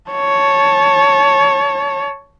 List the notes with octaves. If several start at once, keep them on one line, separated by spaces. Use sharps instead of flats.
C#5 A5